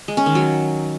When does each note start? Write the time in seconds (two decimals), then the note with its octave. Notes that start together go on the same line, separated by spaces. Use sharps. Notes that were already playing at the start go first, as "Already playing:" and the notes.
0.08 G#3
0.17 C#4
0.26 D#3
0.35 F#3